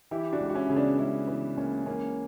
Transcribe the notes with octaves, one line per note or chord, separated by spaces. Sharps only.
E3 E4 G4
D4 F#4
C#2
F#4
C#4 E4
C#3
B3 D4
C#2 C#4 E4
E3 B3
C#2 A#3 C#4
E3 A#3 C#4